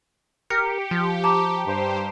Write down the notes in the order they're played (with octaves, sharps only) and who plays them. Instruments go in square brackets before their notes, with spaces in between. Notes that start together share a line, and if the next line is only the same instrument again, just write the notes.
[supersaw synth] G4 [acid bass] A#4 [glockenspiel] C#7
[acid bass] F3
[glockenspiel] A5 A#5 [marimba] D6
[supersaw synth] G2 G4 C5